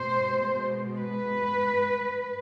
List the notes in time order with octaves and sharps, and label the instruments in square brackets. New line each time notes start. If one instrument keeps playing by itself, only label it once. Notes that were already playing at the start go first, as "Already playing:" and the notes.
Already playing: [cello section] B2 G#3 C5
B4